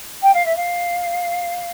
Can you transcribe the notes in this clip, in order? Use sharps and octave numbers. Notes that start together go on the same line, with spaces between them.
G5
F5
E5
F5